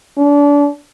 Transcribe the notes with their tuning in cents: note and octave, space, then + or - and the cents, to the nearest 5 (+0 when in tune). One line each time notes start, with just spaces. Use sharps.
D4 -30